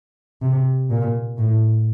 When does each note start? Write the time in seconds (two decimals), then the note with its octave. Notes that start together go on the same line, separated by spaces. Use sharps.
0.42 C3
0.90 A#2
1.38 A2